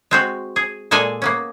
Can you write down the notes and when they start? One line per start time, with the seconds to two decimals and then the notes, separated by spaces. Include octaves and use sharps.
0.11 G#3 C4 F#4
0.56 G#4
0.91 A#2 G#3 A4 D5 D#5 G#5
1.22 A#3 B3 C#4